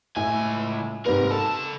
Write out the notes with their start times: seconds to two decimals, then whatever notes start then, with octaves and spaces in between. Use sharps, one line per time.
0.16 C#2 A2 E4 G#5
1.06 G#2 C3 A#4 B4
1.31 C#3 A4 A5